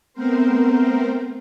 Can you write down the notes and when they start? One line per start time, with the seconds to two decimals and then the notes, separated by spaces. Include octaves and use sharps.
0.13 A3 B3 C4 A#4 C5